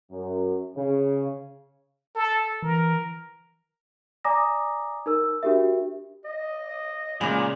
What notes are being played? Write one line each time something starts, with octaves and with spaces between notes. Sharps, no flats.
F#2
C#3
A4
E3 A#4
D5 G#5 A#5 D6 D#6 A#6
D#4 A#4 E6
D4 F#4 G4 A#4 E5
D#5
A#2 C#3 G#3 G#5 B5 D6